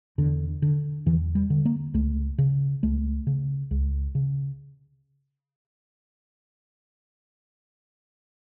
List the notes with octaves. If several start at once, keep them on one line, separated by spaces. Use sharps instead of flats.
E2 D3
D3
E2 E3
G3
D3
A#3
C#2 A3
C#3
C#2 A3
C#3
C#2
C#3